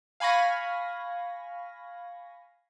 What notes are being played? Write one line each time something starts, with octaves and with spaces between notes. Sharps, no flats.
F5 G#5 B5 C#6 A#6